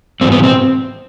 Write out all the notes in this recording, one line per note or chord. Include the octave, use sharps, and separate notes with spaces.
G#2 E3 G3 C4
B3
C4